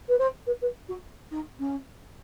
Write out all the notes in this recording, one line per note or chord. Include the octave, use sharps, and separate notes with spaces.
B4
C5
B4
B4
F#4
D#4
C#4